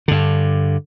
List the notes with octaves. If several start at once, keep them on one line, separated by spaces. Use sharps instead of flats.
G2 D3